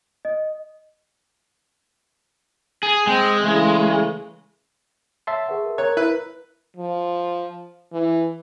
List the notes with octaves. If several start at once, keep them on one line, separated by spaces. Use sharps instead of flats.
D#5
G#4
G#3 C4 G5
C#3 E3 A3
C#5 E5 A5 C6
G#4 B4 F#5
A#4
A#4 C#5 A#5 F#6
E4 B4
F3
E3